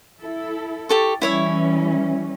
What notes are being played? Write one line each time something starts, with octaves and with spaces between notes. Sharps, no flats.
E4 A4
G4 A4 C#6
E3 G3 C#4 E4 C#5 E5